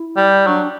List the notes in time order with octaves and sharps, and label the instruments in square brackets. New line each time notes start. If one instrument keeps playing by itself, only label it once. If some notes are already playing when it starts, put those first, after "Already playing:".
Already playing: [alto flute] E4
[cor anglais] G3
[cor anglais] F#3 [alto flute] D4